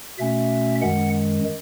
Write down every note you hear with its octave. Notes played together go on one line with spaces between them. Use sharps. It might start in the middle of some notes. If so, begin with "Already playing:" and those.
B2 A3 C#4 E5
F#2 D#3 G#3 F#5